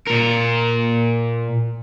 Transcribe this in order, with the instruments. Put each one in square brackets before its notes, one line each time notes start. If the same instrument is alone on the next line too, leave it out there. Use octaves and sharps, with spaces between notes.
[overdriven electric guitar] A#2 A#4